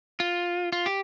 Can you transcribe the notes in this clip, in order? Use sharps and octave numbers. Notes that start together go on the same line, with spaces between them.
F4
F4
G4